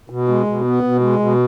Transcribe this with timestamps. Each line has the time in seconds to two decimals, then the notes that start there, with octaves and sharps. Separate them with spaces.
0.10 B2
0.28 G#3
0.46 B2
0.64 B3
0.83 B2
1.01 G#3
1.20 B2